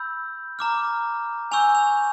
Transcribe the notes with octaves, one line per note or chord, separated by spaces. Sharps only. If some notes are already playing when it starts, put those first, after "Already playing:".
Already playing: B5 E6 G6
A#5 D6 F6
G#5 C#6 E6 G6 F7
F7